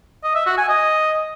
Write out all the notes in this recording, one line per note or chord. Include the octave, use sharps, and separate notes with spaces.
D#5
E5
F#4
G#5
D#5